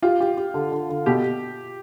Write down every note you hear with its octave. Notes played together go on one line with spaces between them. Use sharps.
F4 G4
G4
G4
D3
D3
D3
B2 G4